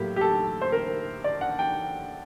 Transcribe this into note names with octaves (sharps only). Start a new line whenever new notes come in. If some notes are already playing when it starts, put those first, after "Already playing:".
Already playing: A2 F#3 A#3 G4
G4
A4
C5
A#4
D5
F#5
G5